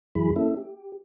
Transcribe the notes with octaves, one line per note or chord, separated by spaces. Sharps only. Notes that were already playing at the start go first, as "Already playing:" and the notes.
F#2 E3 F#3 E4 G#4 B5
A#3 C#4 E4 A4 E5
G4